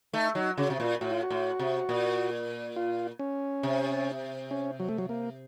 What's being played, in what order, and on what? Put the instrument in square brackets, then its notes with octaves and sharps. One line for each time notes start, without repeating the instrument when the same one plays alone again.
[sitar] A3 [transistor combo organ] D#4
[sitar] F#3 [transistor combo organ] D#4
[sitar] C#3 [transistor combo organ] F#4
[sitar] C3
[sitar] A#2 [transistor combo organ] F4
[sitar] A2 [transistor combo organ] F#4
[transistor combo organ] F4
F#4
[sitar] A2
C3
A#2
[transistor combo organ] F4
C#4
[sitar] C3
[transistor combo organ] C#4
F#3
A3
F#3
A#3